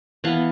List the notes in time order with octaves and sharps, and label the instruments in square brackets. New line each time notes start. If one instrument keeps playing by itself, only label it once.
[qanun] E3 B3 F5 A5